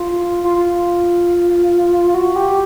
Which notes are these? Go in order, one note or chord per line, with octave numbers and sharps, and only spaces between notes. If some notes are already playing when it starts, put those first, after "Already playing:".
Already playing: F4
F4
F#4
G4